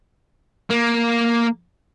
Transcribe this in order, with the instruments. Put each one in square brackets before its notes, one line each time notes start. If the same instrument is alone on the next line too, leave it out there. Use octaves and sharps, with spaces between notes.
[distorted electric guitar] A#3